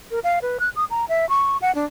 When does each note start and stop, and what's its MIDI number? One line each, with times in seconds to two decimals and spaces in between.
0.11 0.19 70
0.24 0.39 77
0.42 0.58 71
0.60 0.69 90
0.76 0.85 87
0.90 1.05 82
1.09 1.28 76
1.29 1.57 85
1.62 1.74 78
1.75 1.85 62